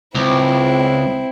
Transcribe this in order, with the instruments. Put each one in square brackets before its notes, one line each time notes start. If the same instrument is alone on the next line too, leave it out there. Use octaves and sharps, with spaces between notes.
[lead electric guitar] C#2 [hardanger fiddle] C4 E4